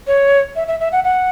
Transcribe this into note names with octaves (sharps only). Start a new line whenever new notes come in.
C#5
E5
E5
E5
F#5
F#5